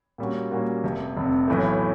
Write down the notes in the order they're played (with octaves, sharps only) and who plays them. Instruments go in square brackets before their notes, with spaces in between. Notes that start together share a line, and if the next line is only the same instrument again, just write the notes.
[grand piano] A#2 G3 A#3 C#4 F#4
A#2 G3 A#3 C#4 F#4
F1 F2 C3
F1 F2 C3
B1 A2 E3 A3